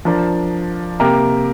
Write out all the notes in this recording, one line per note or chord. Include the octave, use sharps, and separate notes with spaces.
F3 D4 A#4
C3 A#3 G4 A#4